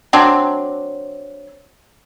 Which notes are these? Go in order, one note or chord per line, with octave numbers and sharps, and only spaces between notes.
F#3 C4 D4